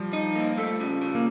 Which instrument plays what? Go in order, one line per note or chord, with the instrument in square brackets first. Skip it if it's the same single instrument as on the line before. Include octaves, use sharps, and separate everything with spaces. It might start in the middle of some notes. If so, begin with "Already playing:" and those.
Already playing: [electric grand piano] F3 G3
[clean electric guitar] D#4
A#3
A3
C#3
C#3
[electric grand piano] A#3